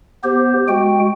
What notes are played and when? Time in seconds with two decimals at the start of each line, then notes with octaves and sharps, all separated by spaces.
0.24 B3 G4 C5
0.68 G#3 F#4 G5